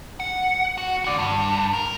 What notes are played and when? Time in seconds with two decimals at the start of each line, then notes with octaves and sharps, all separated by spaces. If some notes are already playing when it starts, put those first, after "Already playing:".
0.20 F#5
0.78 F#4
1.04 F#4 D5
1.19 G2
1.73 A#4